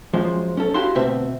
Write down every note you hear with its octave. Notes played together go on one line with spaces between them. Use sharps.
F#2 F3 G#3 C5
C#4 A4
E4 F#4 G4 F5 A5 C6
D2 B2 C4 E5 A5